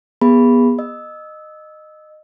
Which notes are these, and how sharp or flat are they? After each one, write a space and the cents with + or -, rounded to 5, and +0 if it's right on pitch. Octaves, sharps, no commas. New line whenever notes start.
B3 -25 G#4 -30 B5 +0
D#5 -15 E6 -10